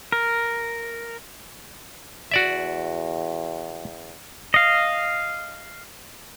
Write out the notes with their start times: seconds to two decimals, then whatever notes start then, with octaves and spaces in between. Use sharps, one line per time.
0.12 A#4
2.31 E2 F#4 D5 E5
4.54 D#5 F5